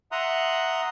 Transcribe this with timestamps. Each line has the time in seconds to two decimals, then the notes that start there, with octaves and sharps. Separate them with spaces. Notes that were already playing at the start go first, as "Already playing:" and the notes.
0.12 E5 F#5 A#5 C6 D#6 F#6